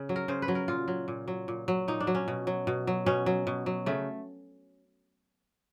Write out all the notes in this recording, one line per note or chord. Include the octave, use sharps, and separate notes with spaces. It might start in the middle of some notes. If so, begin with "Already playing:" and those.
Already playing: C#3
F#3
A#4
C#3 C5
B4
F#3
A#4
A#2 F4
F#3
A#2
F#3
A#2
F#3
A#2 D#4
D4
F#3
C#4
B2
F#3
B2
F#3
B2 C#4
F#3
B2
F#3
C#3 A3